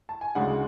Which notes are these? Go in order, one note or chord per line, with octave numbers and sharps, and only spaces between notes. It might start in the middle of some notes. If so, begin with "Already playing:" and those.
A5
G#5
D2 C#3 G#3 D4 F#5